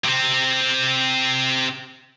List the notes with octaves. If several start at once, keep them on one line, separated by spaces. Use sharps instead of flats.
C3 C4